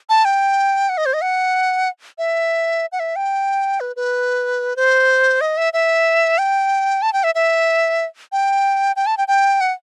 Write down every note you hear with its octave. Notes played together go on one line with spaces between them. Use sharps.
A5
G5
F#5
D#5
C5
D#5
F#5
E5
F#5
E5
G5
B4
B4
C5
D#5
E5
E5
G5
A5
G5
E5
E5
G5
G5
A5
G5
G5
F#5